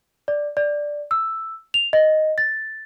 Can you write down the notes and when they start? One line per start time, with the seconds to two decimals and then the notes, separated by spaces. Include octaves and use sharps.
0.28 D5
0.57 D5
1.11 E6
1.74 F7
1.93 D#5
2.38 A6